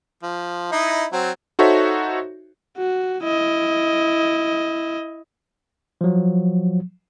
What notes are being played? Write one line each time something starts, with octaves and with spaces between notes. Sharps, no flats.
F3
D#4 E4 D#5
F#3 C4
D#4 F#4 A4 C5 C#5 E5
F#4
E4 D#5
F3 F#3